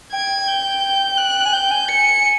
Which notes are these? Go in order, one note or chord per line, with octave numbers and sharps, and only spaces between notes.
G5 G#6
G6
F#6
G#5
G5 G6
G#5
C#7